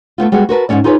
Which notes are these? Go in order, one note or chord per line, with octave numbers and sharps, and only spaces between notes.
A3 B3 C4 F4
G3 G#3 B3 F#4 G#4
F#4 A#4 B4 A5
G#2 D3 A3 C#4 D5
D#4 F4 G#4 A#4 B4 C#5